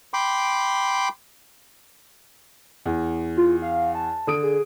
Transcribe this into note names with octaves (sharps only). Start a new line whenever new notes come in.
G5 B5 C6 D6
E2
F4
F5
A5
D3 D#6 D7
G#4